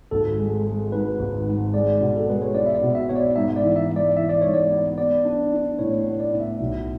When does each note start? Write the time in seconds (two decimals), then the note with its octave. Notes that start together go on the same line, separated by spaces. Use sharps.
0.11 G#1 A4
0.38 G#3
0.66 G#3
0.92 G#2 B4
1.19 G#1
1.46 G#2
1.73 G#3 D5
2.01 B2
2.17 A4
2.27 G#3 B4
2.42 C#5
2.54 B3 D5
2.66 E5
2.75 D5
2.82 B2
2.95 E5
3.09 B3 C#5
3.15 D5
3.36 G#2 E5
3.56 D5
3.63 E3
3.76 E5
3.90 G#2
3.96 D5
4.17 E3 E5
4.29 D5
4.41 G#2 C#5
4.54 D5
4.71 B3
4.98 B3 D5
5.25 D4
5.52 D4
5.79 A2 C#5
5.99 C#5
6.06 B3
6.20 D5
6.33 A2
6.40 E5
6.60 B1